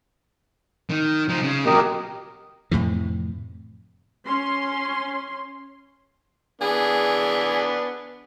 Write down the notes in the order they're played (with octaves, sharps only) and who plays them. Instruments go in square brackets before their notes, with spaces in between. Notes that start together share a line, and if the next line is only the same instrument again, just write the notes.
[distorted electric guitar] D#3
F3 D#4
C#3
[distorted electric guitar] A#2 F#3 [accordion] G4 A#4 D#5
[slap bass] F2 A2 C3 E3
[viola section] C#4 C6
[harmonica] E3 B3 D4 [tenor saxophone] G#4